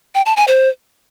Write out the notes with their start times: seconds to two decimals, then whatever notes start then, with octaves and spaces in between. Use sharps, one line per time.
0.15 G5
0.26 A5
0.37 G#5
0.48 C5